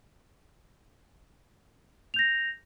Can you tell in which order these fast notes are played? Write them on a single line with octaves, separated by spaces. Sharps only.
F7 G6 A#6